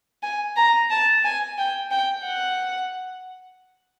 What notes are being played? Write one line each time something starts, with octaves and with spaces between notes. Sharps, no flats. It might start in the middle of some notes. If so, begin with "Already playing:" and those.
G#5
A#5
A5
G#5
G5
G5
F#5